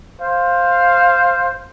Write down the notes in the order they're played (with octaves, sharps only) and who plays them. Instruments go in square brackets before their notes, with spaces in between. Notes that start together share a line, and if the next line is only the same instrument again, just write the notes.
[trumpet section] C5 F5